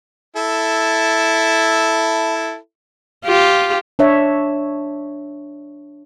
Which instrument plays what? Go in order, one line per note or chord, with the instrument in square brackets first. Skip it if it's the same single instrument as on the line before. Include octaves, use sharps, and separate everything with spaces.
[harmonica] E4 A4
[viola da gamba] F4 G4
[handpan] D4 C#5 E5